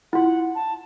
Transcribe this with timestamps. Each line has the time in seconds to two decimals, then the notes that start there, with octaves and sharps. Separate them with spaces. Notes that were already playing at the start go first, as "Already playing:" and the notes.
0.13 E4 F4 F#5
0.55 A5